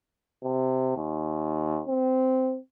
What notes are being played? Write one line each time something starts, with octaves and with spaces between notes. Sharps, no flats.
C3
D#2
C4